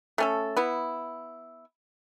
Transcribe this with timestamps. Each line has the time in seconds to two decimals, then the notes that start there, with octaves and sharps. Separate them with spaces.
0.18 A3 C#4 A4
0.57 B3 E4